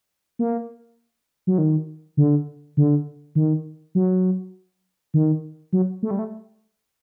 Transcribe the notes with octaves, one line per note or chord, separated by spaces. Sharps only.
A#3
F#3
D#3
D3
D3
D#3
F#3
D#3
F#3
A3
G3
A3